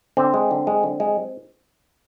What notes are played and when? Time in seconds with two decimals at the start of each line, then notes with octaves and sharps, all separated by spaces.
0.17 D3 C4
0.34 G#3
0.51 D3
0.67 G#3
0.83 D3
1.00 G#3